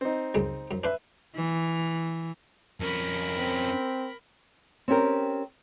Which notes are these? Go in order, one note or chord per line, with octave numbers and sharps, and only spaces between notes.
C4 D#4
C#2 F#2 G#3
F#2
D4 B4 C5 E5
E3
F2 C#4 A#4 B5
C4
C4 C#4 G4 A#4